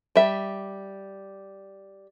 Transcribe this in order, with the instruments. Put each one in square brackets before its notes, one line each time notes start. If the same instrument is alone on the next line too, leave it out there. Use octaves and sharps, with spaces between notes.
[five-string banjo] G3 E5